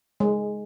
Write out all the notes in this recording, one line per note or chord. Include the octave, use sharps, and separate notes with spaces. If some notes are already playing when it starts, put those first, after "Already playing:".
G#3